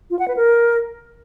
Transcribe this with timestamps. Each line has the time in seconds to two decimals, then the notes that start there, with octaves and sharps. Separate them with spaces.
0.10 F4
0.19 F#5
0.28 B4
0.37 A#4